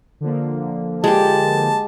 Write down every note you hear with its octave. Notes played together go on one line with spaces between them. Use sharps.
D3 F3 A#3
G#3 G4 A5